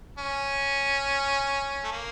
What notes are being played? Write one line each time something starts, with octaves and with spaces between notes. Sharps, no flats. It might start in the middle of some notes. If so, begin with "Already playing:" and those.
C#4
A3
A#3